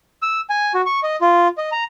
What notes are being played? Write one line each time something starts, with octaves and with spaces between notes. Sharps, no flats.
E6
G#5
F#4
C#6
D#5
F4
D#5
A#5